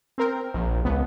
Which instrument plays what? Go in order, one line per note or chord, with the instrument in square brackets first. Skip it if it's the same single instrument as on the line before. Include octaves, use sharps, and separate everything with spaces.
[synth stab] C4 A#4 G5
[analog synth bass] A#1
[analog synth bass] C#2 [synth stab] B3